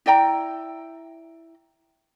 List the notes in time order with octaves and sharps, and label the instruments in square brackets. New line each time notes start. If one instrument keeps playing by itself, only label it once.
[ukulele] E4 D5 G5 A#5